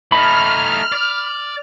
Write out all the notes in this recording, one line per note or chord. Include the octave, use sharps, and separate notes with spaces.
A3 D#4 B5 F6
D5